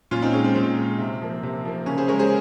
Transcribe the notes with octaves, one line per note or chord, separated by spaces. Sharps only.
A#2 C#4 F4
C4 D#4
G#3 C#4
C4
A#2 C4
G#3
C3
F3 A#3
C3
F3 A#3
C#3 C#4
G#4 C5
G#3 A#4 C#5
G#4 C5